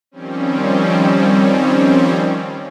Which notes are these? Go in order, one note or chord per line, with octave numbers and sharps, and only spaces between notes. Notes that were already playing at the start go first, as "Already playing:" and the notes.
D#3 F3 G3 C4 C#4